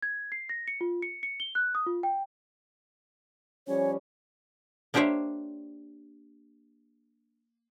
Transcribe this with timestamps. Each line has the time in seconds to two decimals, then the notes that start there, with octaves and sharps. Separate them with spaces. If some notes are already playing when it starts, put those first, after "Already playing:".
0.03 G#6
0.32 C7
0.49 A#6
0.68 C#7
0.81 F4
1.02 C#7
1.23 C#7
1.40 G7
1.55 F#6
1.75 D#6
1.87 F4
2.03 G5
3.68 F3 G3 C#4 C#5
4.94 A#3 D4 G4 C5 C#5 E5